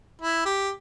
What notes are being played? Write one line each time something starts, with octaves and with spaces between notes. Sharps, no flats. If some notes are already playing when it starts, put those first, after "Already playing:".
E4
G4